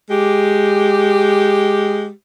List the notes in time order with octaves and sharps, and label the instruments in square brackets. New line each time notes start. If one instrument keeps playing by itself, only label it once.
[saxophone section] G#3 G4